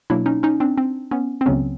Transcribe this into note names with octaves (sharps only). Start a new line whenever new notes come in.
B2 F#3 A#3 D4 E4
C#4 D#4
C#4 D#4
C4 D4
C4
B3 C#4
C4
C#2 C#3 F#3 B3 C#4